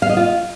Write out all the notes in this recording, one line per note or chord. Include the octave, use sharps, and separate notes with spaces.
F5
D#5
F4